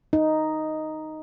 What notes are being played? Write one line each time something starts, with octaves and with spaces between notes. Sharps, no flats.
D#4